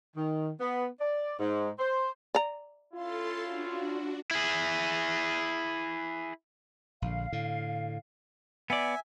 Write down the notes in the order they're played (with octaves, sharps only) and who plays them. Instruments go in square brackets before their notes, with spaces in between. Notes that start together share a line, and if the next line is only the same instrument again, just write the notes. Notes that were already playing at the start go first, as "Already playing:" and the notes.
[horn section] D#3
B3
D5
G#2
C5
[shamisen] D5 A#5
[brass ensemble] C#4 E4 F4 [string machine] A4 A5 C6
[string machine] D4 F#4
[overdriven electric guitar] E4 G#4
[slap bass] A#1 D3 [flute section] F5
[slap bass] A2 D3
[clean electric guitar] B3 D5 [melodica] E5 G#5